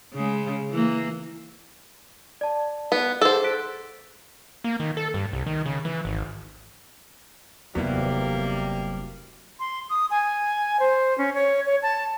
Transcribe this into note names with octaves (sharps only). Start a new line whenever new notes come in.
C#3 G#3
E3 A#3
D5 A5
B3
G#4 A4 C5 F#5
F#6 B6 D7
A#3
D#3
A4
G2
C2
D#3
C#3
E3
G#1
F1 D#2 C3 F#3 G3 A#3 B3 E4
C6
D#6
G#5
C5
C#4
C#5
C#5
A5